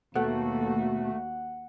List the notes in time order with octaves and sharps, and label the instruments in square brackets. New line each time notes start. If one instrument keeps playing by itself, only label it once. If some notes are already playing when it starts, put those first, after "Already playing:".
[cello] D#2 F#4 [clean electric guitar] B2 [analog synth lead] A3 [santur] F#5